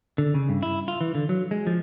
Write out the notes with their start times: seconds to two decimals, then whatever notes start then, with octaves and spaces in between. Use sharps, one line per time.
0.18 D3
0.34 C#3
0.49 G2
0.63 E4
0.88 F4
1.01 E3
1.15 D3
1.29 F#3
1.51 G#3
1.67 F3